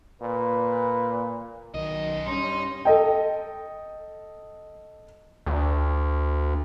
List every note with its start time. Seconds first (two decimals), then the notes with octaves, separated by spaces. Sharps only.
0.22 A#2 B4
1.74 B1 F#2 D#3 D#5
2.26 G2 C#4 D#4 C6
2.85 A4 D#5 G5
5.46 D2